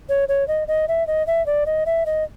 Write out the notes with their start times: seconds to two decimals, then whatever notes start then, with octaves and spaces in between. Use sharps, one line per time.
0.09 C#5
0.29 C#5
0.48 D#5
0.68 D#5
0.88 E5
1.07 D#5
1.27 E5
1.46 D5
1.66 D#5
1.86 E5
2.06 D#5